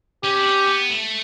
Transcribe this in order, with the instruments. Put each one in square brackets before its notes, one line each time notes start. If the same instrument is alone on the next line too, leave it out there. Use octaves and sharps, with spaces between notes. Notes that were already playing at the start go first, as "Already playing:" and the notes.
[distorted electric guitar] C#4 [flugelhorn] G4
[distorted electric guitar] D4
C#4
B3
A3